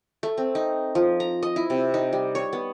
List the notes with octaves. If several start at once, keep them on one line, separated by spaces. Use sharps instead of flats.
A3
C4
D#4
F3
A#5
D#5
E4
C3
D#4
G3
C#5
B3